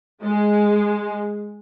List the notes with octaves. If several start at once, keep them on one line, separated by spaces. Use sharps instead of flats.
G#3